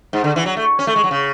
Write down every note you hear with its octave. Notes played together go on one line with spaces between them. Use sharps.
G#2
D3
E3
F#3
A3
C#4
A3
G#3
F#3
C#3